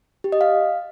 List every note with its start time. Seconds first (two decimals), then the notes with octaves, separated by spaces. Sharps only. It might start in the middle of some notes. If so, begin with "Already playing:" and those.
0.24 G4
0.32 D#5
0.41 F5